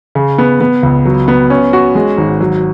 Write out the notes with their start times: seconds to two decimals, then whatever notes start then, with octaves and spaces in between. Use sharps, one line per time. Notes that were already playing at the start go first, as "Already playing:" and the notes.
0.15 C#3
0.38 B3
0.61 B3
0.83 C#2
1.05 F#3
1.28 B3
1.50 C#4
1.73 F#4
1.95 G#3
2.18 G#1
2.41 F#3